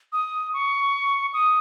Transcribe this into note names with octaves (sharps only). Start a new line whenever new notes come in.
D#6
C#6
D#6